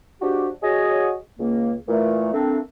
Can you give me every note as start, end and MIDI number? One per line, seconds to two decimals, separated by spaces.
0.22 0.49 53
0.22 0.49 56
0.22 0.49 62
0.22 0.49 66
0.22 0.49 67
0.63 1.14 66
0.63 1.14 68
0.63 1.14 73
0.63 1.14 75
1.39 1.74 37
1.39 1.74 58
1.88 2.31 46
1.88 2.31 52
1.88 2.31 57
2.33 2.59 57
2.33 2.59 58
2.33 2.59 60
2.33 2.59 62